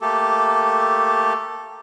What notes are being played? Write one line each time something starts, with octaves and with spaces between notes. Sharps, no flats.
A3 A#3 G4 A4